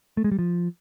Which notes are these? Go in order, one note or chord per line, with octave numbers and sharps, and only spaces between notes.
A3
G#3
G3
F3